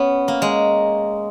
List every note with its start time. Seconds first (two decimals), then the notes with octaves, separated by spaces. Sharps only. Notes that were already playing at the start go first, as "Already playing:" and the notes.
Already playing: B3 C#4
0.28 A#3
0.42 G#3